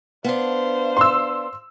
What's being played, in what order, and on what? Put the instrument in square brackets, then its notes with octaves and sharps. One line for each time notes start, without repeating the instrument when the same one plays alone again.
[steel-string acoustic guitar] B3 D4 [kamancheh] C5 F5
[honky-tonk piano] C6 E6